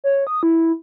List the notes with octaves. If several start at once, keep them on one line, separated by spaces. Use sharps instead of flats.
C#5
D#6
E4